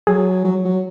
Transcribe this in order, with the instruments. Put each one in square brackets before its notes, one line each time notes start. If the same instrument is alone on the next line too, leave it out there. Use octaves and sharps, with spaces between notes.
[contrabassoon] F#3 [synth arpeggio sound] G#4
[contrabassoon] F#3
F#3